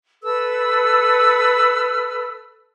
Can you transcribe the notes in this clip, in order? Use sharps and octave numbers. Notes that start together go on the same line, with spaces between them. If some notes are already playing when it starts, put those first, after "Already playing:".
A4 B4 E6